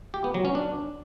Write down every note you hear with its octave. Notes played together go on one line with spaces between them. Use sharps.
G4
B3
F#3
C#4
D4